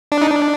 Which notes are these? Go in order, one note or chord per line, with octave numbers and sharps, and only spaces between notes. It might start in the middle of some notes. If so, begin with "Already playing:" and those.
D4
D#4
D4